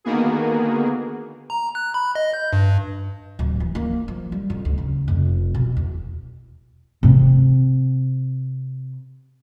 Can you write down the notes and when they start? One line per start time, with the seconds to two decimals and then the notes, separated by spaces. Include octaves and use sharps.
0.04 D3 D#3 A#3 B3 F#4 G#4
1.50 A#5
1.75 F#6
1.94 B5
2.15 D#5
2.34 G6
2.53 G2
3.39 D1
3.60 E3
3.75 A#3
4.08 F3
4.32 G3
4.50 F2
4.65 D2
4.78 C#3
5.08 F1
5.54 B2
5.77 E2
7.03 C3 C4